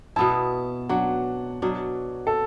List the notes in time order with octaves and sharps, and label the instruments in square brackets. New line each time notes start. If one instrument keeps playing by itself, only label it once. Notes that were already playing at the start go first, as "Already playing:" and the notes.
[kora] B2 B3 E4 [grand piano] A5
[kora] F#3 D4 F#4 [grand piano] F#5
[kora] B2 F#3 D4
[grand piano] A4